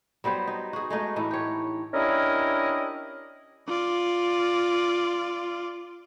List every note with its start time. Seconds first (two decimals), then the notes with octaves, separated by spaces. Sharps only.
0.24 F#3 G3 B3 C5
0.47 D#4
0.73 F#4 G#4
0.90 G#3 A3 D#4
1.16 A2 E3 D#4 E4
1.31 G4 C#5
1.93 C#4 D4 E4 G4 A#4 D#5
3.68 F4 D5